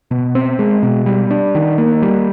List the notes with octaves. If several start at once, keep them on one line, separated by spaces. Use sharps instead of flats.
B2
C4
G#3
B2
G3
D4
D#3
A#3
G3